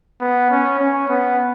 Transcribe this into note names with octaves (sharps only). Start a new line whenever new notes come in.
B3
C#4
C#4
B3